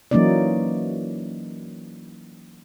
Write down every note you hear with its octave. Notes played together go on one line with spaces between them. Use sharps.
E3 F#3 A#3 C#4 D#4 D5